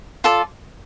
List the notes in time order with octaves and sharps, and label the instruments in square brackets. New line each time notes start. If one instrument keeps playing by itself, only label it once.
[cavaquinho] F4 A4 D5